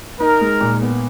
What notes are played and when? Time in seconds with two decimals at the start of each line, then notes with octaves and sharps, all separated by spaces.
0.20 D#4 A#4
0.41 G#3
0.61 A#2
0.82 B3